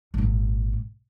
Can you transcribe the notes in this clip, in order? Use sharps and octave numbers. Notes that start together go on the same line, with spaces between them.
G#1 A#2